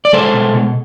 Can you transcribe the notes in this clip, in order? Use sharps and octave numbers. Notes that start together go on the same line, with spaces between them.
D5
G#3 A4 C5
B2
B2